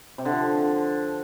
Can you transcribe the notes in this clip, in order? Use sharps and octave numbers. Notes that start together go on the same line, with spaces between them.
C3
D3
F3